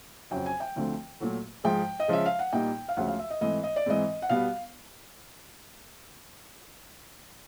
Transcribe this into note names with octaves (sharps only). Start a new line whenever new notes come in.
F2 C#3 F#3 G5
G#5
G5
D2 D3 F3 A3 C4
A#2 F#3 A3
G#2 F3 G#3 G5
D#5
C#3 F3 G#3 E5
F5
F#5
A#2 G3 A#3 D#4 G5
F5
D2 C#3 F3 G#3 F#5
F5
E5
D#5
G#2 E3 A3 C4 D#5
D#5
D5
G#2 E3 G#3 C4 D#5
F#5
B2 G3 B3 F5